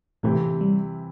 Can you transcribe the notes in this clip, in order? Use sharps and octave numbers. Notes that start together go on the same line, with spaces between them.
A2 C3 E3 A3 C4 G4
G3